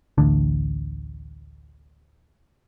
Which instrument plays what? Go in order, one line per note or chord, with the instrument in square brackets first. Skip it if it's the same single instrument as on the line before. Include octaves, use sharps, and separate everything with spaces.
[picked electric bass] A1 D2 D3